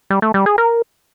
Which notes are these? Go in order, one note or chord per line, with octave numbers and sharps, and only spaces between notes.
G3
A3
G3
G#4
A#4